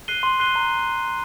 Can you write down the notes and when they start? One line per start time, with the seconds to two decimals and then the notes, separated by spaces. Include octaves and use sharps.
0.08 F#6 C7 D#7 G7
0.23 C6
0.40 F#6 C7 D#7 G7
0.56 A#5